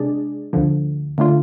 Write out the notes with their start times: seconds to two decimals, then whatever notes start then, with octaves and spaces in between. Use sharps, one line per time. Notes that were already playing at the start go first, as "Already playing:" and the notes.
Already playing: C3 G#3 D4 G#4 D5
0.53 D2 D3 F3
1.18 D3 A3 D4 F4